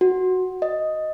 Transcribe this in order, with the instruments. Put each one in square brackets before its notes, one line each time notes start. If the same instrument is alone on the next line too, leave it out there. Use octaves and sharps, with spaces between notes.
[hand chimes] F#4
D#5